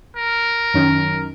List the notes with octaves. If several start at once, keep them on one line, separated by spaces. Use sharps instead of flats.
A#4
F#2 D#3 C#4